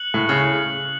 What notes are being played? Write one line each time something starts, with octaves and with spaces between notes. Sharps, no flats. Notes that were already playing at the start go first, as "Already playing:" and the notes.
Already playing: F#6 C#7 F#7
A2
C#3